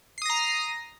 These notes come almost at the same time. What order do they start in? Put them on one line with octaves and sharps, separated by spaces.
C7 D#6 A#6 A#5